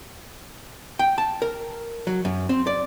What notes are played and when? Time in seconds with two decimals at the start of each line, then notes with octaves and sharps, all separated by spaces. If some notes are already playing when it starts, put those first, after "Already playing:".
0.99 G5
1.18 A5
1.42 A#4
2.07 F#3
2.25 F#2
2.49 C4
2.67 D5